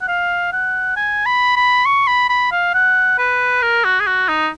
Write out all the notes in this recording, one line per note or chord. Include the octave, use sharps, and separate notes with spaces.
F#5
F5
F#5
G#5
B5
B5
C#6
B5
B5
F5
F#5
B4
A#4
F#4
G#4
F#4
D#4